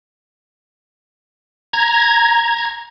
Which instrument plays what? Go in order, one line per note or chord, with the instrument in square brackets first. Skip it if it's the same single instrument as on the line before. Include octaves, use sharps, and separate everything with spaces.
[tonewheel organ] A#5 G#6